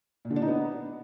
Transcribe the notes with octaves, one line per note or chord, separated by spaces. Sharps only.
A#2
D3
D4
D#4
B3